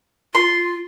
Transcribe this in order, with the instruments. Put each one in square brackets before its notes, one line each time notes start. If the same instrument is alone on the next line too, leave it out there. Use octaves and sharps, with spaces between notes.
[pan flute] F4 [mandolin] C6